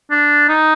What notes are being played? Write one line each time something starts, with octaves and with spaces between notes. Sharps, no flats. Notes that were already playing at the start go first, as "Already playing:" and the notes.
D4
D#4